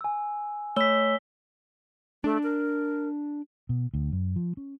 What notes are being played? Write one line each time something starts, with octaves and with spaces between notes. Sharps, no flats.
G#5 E6
A3 C#5 E6 B6 G7
A3 D4
A#4
B2
D2
F#2
F3
C#4